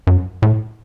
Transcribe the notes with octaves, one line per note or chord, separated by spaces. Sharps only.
F#2
A2